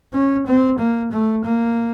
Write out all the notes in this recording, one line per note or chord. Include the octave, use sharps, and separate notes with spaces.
C#4
C4
A#3
A3
A#3